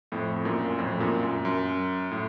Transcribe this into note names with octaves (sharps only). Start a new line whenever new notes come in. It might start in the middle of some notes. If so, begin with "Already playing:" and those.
F2 A2
F#2 A#2
F2 A2
F#2 A#2
F#2
F#2
A2